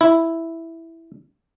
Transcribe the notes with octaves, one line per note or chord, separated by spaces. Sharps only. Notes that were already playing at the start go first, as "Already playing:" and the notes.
E4